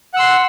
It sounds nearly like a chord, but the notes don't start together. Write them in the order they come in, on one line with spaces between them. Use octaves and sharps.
F#5 E6 C6